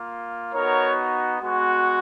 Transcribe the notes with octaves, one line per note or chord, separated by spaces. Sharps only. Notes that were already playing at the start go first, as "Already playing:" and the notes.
Already playing: A#3 F4
B3 D#4 F#4 A#4 C#5
G#3 B3 F#4